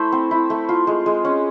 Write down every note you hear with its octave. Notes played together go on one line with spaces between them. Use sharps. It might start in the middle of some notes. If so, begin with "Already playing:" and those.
Already playing: A3 E4 C5
C4
E4
A3
F4
G#3
G#3
C#4